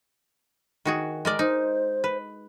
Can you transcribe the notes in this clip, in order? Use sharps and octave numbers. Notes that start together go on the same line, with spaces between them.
D#3 F#4 G#4
G#3 A#4 D5
D#4 C5
B4